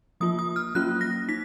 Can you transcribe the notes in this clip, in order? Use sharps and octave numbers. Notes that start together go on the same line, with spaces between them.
F3 A#3 F4 D#6
D#6
F6
F#3 A#3 C#4 F4 F#6
A#6
D#4 B6